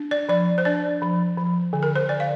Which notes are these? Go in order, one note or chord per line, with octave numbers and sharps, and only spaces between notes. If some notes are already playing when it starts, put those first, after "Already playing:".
Already playing: D4
D5
F3 D5
C5
D4 D5
F3
F3
D3
A#4
C5
D3 D5
F5